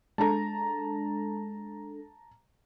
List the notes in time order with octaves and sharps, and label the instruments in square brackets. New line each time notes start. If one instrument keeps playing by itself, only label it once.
[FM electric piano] G#3 D4 A4 [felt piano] A5 A#5